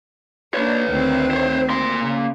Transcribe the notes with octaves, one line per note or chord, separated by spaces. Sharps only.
A#3 D4 B4 C#5
D2 D#3 C4
C5 C#5
A#3 C6
C#3